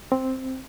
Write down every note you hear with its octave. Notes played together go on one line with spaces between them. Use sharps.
C4